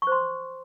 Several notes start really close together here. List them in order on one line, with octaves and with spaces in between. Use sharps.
C#6 C5 C6